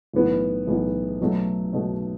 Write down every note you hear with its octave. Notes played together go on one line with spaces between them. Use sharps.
B1 A2 E3 B3
B1 A2 E3 B3
B2 F#3 A3
B2 F#3 A3